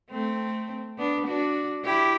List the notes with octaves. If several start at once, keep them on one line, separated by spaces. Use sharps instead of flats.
A3 C4
B3 D4
D4 F#4
E4 G4